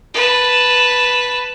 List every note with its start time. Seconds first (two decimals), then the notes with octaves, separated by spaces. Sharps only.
0.14 B4 A5